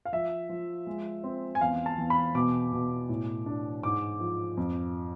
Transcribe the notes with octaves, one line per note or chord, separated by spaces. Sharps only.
F5
F3 E5
F3
G#3
C4
G#5
E2 F5
A5
E2
B5
B2 D6
B2
A2
D4
G#2 D6
F3
F2